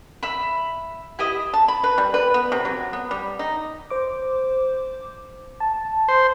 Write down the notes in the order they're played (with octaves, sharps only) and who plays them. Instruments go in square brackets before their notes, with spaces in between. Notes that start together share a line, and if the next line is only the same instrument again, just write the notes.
[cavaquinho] E5 B5
E4 G4 D#5 E5
[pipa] A5
B5
B4
G3
B4
B3
C3
F#3
B3
G3
D#4
[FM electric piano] C5 D6
A5
[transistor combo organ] C5